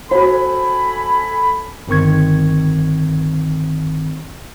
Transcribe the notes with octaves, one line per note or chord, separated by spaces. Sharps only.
F#4 A4 C5 G#5 B5
G1 D#3 C4 C#6 G#6